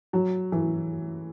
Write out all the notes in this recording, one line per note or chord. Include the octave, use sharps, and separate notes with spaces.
F#3
E3